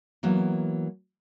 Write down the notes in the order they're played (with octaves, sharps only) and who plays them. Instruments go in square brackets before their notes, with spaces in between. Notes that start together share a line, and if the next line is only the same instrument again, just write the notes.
[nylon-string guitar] E3 F#3 A#3 B3